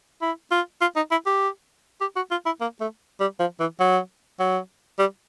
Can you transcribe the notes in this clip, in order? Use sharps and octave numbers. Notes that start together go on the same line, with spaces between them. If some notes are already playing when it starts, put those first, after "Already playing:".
E4
F4
F4
D#4
E4
G4
G4
F#4
F4
E4
A#3
A3
G3
F3
E3
F#3
F#3
G3